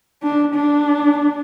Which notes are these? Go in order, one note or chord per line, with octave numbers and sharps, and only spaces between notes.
D4
D4